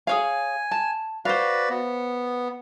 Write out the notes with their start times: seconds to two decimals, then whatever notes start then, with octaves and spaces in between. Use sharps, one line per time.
0.07 G#4 C#5 F5 G#5
0.71 A5
1.25 F#4 B4 C5 D5 F5
1.70 B3